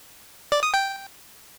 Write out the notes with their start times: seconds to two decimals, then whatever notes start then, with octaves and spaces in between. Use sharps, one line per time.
0.52 D5
0.63 D#6
0.74 G5